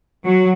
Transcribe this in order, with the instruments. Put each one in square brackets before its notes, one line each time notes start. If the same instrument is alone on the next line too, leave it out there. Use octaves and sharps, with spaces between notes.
[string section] F#3